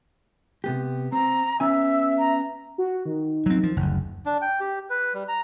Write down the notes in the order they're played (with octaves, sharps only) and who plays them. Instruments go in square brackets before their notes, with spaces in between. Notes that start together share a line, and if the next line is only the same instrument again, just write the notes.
[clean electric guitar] C3 B3 G4
[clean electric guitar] C4 [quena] A#5
[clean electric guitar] B3 C#4 G#5 [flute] E5 [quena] E6
[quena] A#5
[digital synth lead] F#4
D#3
[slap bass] F#3 C4
F3
F#1 D2
[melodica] D4
G5
G4
B4
G3
A#5